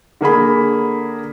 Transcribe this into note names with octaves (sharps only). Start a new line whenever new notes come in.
D3 A#3 G#4 B5